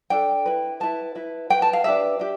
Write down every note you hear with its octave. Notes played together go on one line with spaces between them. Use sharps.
D4 A4 G5
E4 B4
E4 B4 A5
E4 B4
E4 B4 G5
A5
F5
D4 G4 B4 E5
D4 G4